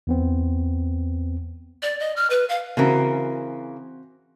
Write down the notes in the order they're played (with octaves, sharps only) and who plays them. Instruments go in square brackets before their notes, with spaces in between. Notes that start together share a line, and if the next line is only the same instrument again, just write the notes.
[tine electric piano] E2 B3 C4
[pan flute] D5
D#5
F6
B4
F5
[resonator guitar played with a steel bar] C#3 E3 A#4 [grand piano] C4 F#4